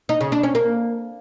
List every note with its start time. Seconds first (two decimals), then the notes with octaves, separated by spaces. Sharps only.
0.09 D#4
0.21 C#3
0.32 D4
0.43 C#4
0.55 A#3